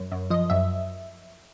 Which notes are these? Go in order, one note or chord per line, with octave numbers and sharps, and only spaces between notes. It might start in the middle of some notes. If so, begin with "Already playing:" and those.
Already playing: F#2
F#2
F3 D#5
F#2 E5